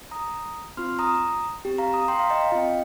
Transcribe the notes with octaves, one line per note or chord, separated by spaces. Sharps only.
A#5 D#6
C4 F4 C6 F6
A#5 D#6
C4 G4
F5 A#5
A#5 D#6
G5 C6
F5 A#5
D#5 G5
F5
C4 F4 D#5 G5